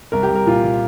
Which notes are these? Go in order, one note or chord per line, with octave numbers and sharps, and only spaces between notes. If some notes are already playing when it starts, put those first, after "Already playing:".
C2 A#4
G4
C2
A#4
A#2 F4
A#2